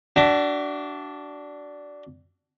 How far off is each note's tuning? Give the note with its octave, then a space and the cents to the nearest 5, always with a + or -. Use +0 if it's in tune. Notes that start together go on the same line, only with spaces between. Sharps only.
D4 -5 F#4 +30 E5 +35